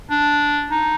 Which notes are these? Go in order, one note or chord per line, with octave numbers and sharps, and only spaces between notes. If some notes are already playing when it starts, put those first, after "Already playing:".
D4
D#4